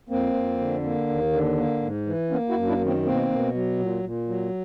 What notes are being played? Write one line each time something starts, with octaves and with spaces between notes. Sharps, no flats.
F2 A#3 C4
F2
D3
A#3
D#2
D3
A#3
G#2
E3
A#3 B3 C#4
E4 F#4
F#2
D4 E4
D#3
A#3 C4
B2 A#3 C4
B2
F#3
A#2
A#2
F#3